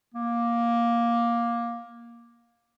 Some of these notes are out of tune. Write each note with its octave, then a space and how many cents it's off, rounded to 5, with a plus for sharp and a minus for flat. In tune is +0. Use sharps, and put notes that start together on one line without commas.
A#3 +10